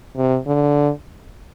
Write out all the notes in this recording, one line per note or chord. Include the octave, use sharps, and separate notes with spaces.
C3
D3